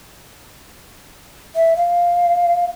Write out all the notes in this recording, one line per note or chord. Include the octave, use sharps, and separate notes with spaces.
E5
F5